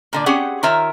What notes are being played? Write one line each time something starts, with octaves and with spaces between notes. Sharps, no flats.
A#2 D3 D5
C4 C#4 G4 G#4 F#5
D#3 F4 A#4 C#5 E5